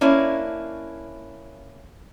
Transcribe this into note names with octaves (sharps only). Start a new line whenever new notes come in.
A#3 C#4 D4 E4